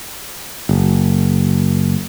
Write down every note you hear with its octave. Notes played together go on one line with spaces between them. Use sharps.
F#1